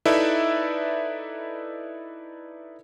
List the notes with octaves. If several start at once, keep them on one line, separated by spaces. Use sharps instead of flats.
D#4 E4 A4 B4 D5 E5